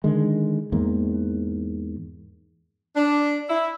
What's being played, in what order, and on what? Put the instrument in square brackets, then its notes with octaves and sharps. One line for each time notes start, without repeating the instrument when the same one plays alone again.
[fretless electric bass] D3 D#3 G#3
E2 G#2 A#3
[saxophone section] D4
E4